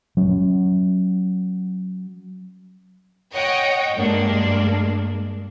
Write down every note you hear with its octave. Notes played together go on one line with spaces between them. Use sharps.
F#3 C#4
C#5 D#5 F#5 G5
G2 G#3 A#3 D4